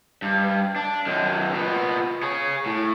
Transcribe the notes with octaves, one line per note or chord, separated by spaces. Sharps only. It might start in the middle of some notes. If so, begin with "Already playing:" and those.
G2
D4
F#2 D#3
A#2 B3
G#4 C#5
A2